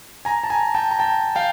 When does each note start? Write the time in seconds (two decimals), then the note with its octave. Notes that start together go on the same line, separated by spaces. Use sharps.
0.25 G#5 A#5
0.44 A5
0.50 G#5 A#5
0.75 G5 A5
0.91 A#5
0.99 G5 A5
1.36 F5 G5